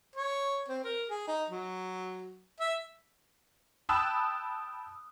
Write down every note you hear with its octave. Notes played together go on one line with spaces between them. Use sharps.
C#5
C4
A#4
G#4
D#4
F#3
E5
G5 A5 B5 D#6 E6 F#6